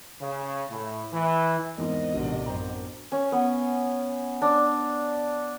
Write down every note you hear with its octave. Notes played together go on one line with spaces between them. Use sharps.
C#3
A2
E3
E2 G#2 B3 C4 A#4 D#5
A1 C3 D4 F#4
F#2 C5 G5 A#5
C#4
B3
D4